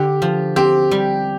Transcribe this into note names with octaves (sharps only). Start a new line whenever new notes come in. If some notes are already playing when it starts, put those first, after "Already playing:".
Already playing: D3 G4
F3
C4 G4
G3